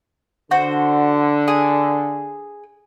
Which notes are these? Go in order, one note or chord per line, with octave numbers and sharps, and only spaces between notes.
D3 F#4 C5
G#4